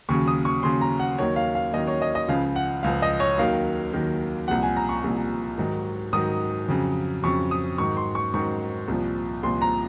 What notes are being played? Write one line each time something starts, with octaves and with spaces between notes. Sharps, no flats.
D#2 C#3 F#3 C#6
D#6
C#6
D#2 C#3 F#3 C6
A#5
F#5
D#2 D#3 F#3 C#5
F5
F5
D#2 D#3 F#3 D#5
C#5
D#5
D#5
C#2 C#3 F3 F5
F#5
C#2 C#3 F3 F5
D#5
C#5
D#2 D#3 F#3 F5
D#2 D#3 F#3
C2 A#2 F3 F#5
G#5
A#5
C#6
C2 A#2 F3
G#2 D#3 F#3
G#2 D#3 F#3 D#6
F2 C#3 F#3
F2 C#3 F#3 C#6
D#6
G#2 D#3 F#3 C#6
C6
C#6
G#2 D#3 F#3 C#6
C2 A#2 F3
C2 A#2 F3 C6
A#5